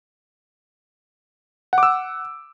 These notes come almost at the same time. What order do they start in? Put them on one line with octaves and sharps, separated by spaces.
F#5 D6 E6